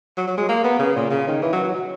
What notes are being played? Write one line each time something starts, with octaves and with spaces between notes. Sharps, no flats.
F#3
F#3
G#3
A#3
B3
C#3
A#2
C#3
D#3
E3
F#3
F#3
F#3